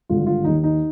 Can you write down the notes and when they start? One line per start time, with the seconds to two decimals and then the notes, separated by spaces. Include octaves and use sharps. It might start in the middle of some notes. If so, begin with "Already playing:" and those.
0.09 G#1 G2 D3 F4
0.27 F4
0.44 D#2 D#3 D#4
0.64 D#4